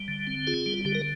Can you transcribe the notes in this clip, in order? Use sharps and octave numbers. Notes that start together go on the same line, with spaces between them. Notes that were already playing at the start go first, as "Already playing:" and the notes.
Already playing: G3
D3
C4
F4 G#4
G3
D3 G4
A#4